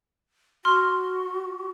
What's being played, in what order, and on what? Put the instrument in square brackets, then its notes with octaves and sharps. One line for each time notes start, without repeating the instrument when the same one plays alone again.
[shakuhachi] F#4 [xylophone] C6 F6